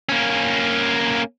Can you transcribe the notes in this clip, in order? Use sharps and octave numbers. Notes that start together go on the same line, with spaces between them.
A#3 C#4